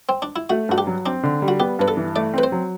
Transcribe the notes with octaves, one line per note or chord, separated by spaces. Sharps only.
C4
D4
E4
A3 F#4
G2 F#4
G4
F#3
C4 D4
D3
G3
F#4
B3 G4
G2 B4
A4
E3
A3 D5
C4 B4
C5
F#3